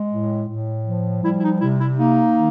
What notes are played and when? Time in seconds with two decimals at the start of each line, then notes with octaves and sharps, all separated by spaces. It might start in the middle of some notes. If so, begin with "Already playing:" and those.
Already playing: G#3
0.11 A2
0.48 A2
0.86 F3
1.22 G3 E4
1.37 E4
1.42 D#4
1.59 C3 E4
1.78 E4
1.97 A#3 D#4
2.34 D#3